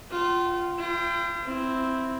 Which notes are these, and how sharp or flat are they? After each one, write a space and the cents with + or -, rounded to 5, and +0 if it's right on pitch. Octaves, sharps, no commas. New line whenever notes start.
F4 +0 G5 -45
F4 -45 G5 +0
C4 +0 E4 +0